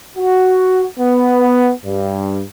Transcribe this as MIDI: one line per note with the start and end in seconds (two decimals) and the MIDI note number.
0.17 0.86 66
1.00 1.72 59
1.85 2.42 43